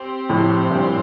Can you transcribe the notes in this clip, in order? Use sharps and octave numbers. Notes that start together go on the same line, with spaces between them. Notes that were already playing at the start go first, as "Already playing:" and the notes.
Already playing: C4 G4 C5
F2 A2
G2 A#2